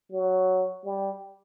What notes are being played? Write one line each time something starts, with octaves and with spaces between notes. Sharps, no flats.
F#3
G3